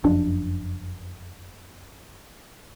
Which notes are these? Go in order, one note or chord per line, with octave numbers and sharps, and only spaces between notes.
F#1 F2 D4